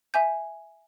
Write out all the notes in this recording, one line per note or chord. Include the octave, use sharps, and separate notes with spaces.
E5 G#5 G6